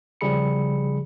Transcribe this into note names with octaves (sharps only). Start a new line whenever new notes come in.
C#3 F3 G3 G#4 B5 C#7